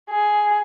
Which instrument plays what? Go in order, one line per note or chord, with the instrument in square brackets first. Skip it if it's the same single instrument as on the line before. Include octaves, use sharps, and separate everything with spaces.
[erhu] G#4